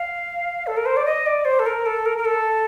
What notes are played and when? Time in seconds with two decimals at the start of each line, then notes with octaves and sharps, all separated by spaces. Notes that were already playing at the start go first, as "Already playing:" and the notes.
Already playing: F5
0.67 A4
0.77 A#4
0.86 C5
0.97 D5
1.06 D#5
1.26 D5
1.45 C5
1.59 A4
1.66 A#4
1.86 A4
2.06 A#4
2.18 A#4
2.25 A4